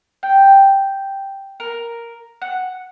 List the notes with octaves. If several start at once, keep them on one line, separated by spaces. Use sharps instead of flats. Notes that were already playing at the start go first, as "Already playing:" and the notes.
G5
A#4
F#5